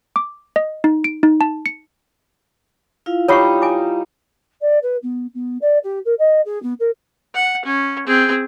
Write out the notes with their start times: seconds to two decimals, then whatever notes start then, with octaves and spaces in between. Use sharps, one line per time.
0.16 D6
0.56 D#5
0.84 D#4
1.04 D7
1.23 D#4
1.41 A5
1.66 C#7
3.06 E4 F4 F5
3.28 G3 D#4 C#5 F#5 C#6
3.62 G#5 D6
4.61 D5
4.82 B4
5.02 B3
5.34 B3
5.61 D5
5.83 G4
6.05 A#4
6.18 D#5
6.45 G#4
6.62 B3
6.79 A#4
7.34 F#5
7.65 C#4
8.07 C4 G#4